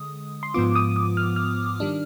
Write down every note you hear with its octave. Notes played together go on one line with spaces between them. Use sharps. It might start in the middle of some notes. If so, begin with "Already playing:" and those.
Already playing: D3 G#3 D#6
C6
G#2 F3 B3 F4 D6
D#6
D#6
F6
F6
D#3 G3 D4